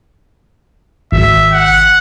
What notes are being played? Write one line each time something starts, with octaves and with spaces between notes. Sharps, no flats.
G#1 E5
F#5